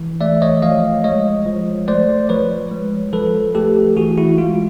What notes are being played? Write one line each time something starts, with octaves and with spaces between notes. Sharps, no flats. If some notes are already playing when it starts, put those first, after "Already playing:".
Already playing: E3
A3 D5 E5
C#5 D#5
F3 D#5 F5
G#3 C#5 D#5
F3
A3 C5 D5
F3 B4 C#5
G#3
F3 A4 B4
A3 G4 A4
E3 F#4 G#4
E4 F#4
G#3 F4